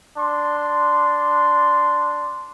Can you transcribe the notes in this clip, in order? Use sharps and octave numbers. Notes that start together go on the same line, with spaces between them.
D4 C6